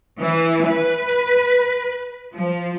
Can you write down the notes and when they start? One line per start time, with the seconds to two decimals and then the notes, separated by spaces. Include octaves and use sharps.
0.19 E3
0.67 B4
2.35 F3